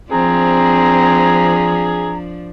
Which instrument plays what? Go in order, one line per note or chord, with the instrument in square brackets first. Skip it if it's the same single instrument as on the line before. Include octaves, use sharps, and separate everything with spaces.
[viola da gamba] F3 D4 [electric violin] C4 [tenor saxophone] G#4 [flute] A#5